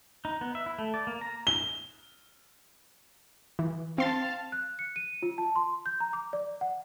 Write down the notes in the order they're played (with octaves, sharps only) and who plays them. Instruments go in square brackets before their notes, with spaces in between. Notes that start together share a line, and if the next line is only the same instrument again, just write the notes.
[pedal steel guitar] D#4
B3
E5
E4
A3
D5
A#3
A#5
[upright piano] G7
[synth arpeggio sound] E3
[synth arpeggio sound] C4 C6 A6 [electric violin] F5 A5
[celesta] F#6
C#7
D#7
F4
A5
C6
G6
A#5
D6
D5
F#5